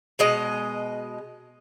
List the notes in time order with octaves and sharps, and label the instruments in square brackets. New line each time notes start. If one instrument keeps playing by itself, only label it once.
[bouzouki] B2 G#3 D#5